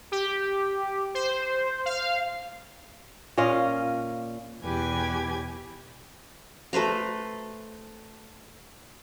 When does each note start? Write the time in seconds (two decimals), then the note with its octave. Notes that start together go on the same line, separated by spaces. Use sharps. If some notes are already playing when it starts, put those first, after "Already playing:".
0.12 G4
1.15 C5
1.86 F5
3.37 A#2 C#4 D#5 F5
4.64 E2 B2 G4 B4 G#5 G#6
6.73 A3 B4 C5 A#5